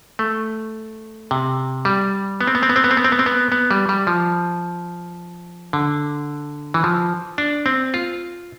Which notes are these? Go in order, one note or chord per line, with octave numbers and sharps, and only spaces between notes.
A3
C3
G3
B3
C4
B3
C4
B3
C4
B3
C4
B3
C4
B3
C4
B3
B3
G3
G3
F3
D3
E3
F3
D4
C4
F4